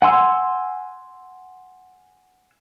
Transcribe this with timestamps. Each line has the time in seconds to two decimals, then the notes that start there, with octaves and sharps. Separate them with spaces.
0.02 F#5 G#5 C6 E6